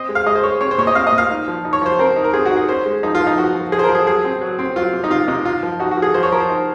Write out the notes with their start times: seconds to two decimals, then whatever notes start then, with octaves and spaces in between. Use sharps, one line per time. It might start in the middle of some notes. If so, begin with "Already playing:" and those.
Already playing: C4 D#5
0.09 G#3
0.15 F5
0.26 G#3 D#5
0.35 C5
0.43 G#3 C#5
0.61 C4 C#5
0.71 C5
0.78 A#2 C#5
0.87 D#5
0.95 C4 F5
1.07 D#5
1.12 A#2
1.18 F5
1.30 D#4
1.48 F3
1.65 D#4
1.73 C#5
1.81 F3 C5
1.99 C4 A#4
2.16 D#4
2.24 A#4
2.34 C4 G#4
2.45 F#4
2.51 D#4
2.57 G#4
2.69 C#4 C5
2.86 G#3
3.03 F3 D#4
3.15 F4
3.21 F3
3.27 D#4
3.38 F3 F#4
3.55 F3
3.72 F3 G#4
3.79 C5
3.83 A#4
3.89 F3
3.95 G#4
4.07 F#3 G#4
4.24 C4
4.41 F#3
4.59 C4
4.76 F#3 F4
4.93 C3
5.04 D#4
5.10 C3 F4
5.28 C3 D#4
5.45 D#4 F4
5.63 F3
5.79 D#4 F#4
5.91 F#4
5.97 F3
6.02 G#4
6.14 F3 C5
6.23 C#5
6.32 F3 A#4
6.40 C5
6.49 D#4